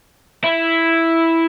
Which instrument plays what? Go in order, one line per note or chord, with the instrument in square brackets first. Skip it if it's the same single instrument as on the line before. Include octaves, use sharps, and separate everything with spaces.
[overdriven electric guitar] E4